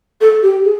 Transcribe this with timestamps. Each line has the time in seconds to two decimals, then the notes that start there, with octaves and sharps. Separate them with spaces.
0.21 A4
0.43 G4
0.65 G#4